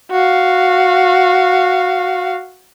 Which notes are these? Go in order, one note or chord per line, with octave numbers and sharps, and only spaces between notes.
F#4 F5